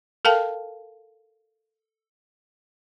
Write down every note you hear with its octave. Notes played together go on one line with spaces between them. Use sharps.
A4 A#4 F5 G5 A5